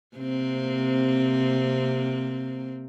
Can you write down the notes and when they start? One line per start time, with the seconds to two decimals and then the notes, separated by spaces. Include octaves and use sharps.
0.17 C3 A#3 C4